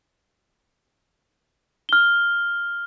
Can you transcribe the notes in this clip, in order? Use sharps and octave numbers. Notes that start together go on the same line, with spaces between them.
F6 G7